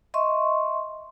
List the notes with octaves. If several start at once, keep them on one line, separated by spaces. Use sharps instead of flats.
D#5 E5 C6 C#6